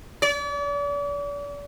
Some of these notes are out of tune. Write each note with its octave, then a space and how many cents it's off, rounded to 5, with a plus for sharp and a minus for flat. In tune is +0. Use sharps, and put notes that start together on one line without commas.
D5 -40